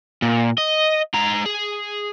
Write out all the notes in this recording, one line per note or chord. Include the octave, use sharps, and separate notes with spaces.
A#2
D#5
G#3 A#5
G#4